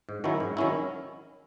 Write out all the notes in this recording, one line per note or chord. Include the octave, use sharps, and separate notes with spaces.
G#2
D#3 F#3 C#4 E4
G#2
D#3 F#3 C#4 E4